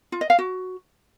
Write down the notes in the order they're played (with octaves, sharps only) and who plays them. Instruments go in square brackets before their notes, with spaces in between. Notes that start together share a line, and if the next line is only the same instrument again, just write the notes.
[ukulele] F4
D#5
F5
F#4